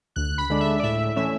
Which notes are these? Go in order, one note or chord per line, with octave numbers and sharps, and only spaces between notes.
D2 F#6
B5
D3 G#3 D4
E5
D5
A2 E5
E3 A3 C#4 E5